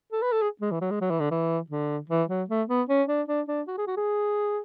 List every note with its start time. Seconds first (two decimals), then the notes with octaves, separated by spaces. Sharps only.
0.12 A4
0.22 B4
0.32 A4
0.41 G#4
0.61 G#3
0.71 E3
0.81 F#3
0.91 G#3
1.01 F#3
1.10 E3
1.20 D3
1.31 E3
1.70 D3
2.09 E3
2.29 F#3
2.49 A3
2.68 B3
2.89 C#4
3.08 D4
3.28 D4
3.48 D4
3.67 F#4
3.78 G#4
3.87 F#4
3.97 G#4